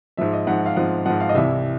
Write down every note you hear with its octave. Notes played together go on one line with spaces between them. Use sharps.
G#2 F3 E5
D#5
G#2 F3 F#5
F5
G#2 F3 F#5
G#2 F3 F#5
F5
D#5
C2 C3 E3 E5